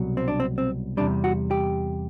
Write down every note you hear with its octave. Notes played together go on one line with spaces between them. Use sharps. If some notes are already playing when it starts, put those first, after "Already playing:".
Already playing: C2 B2 F#3
C4
D4
C4
C4
E2 C3 G3 D4
F#4
G4